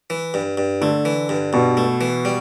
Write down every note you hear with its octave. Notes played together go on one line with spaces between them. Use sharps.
E3
G2
G2
D3 A3
E3
G2
G2 B2
A3
E3
G3